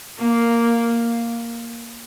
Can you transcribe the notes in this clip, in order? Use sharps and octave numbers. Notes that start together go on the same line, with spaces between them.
A#3